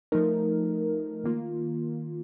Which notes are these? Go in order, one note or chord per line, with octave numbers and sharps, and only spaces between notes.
F3 A3 D#4 A#4
D#3 A#3 F4